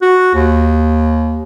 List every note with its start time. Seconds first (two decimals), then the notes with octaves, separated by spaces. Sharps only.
0.02 F#4
0.34 D#2